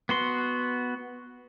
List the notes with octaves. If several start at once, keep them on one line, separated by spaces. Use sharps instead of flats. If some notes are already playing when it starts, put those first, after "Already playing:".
B3 F#4 C6